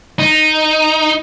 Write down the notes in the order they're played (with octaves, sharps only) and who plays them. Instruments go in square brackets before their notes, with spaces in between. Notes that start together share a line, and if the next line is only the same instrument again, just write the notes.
[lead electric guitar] D#4